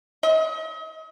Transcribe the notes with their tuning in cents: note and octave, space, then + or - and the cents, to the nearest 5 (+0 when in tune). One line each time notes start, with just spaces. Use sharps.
D#5 +40